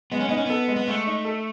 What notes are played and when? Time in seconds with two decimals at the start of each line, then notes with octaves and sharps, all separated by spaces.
0.12 G#3 B3
0.20 C#4
0.29 B3 D#4
0.37 C#4
0.46 B3 A4
0.68 G#3
0.76 B3
0.87 G#3 A3
1.07 D#4
1.25 A4